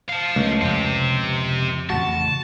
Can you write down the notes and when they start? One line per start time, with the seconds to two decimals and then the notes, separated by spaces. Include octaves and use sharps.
0.09 F5 A5
0.36 C#2 G#3 A3
0.61 F2 C4 G4
1.90 A1 F2 C#3 F#4 A5